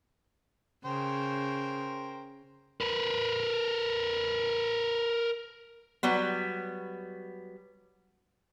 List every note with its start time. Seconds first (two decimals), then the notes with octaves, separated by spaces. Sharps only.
0.85 C#3 A#4 C5 G5
2.81 A#4 B4
6.03 F#3 G3 B3